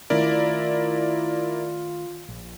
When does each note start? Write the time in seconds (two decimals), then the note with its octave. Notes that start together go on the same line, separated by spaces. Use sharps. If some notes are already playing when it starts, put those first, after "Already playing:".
0.10 D#3 A3 C#4 E4 F4 A#4 D5
2.28 A#1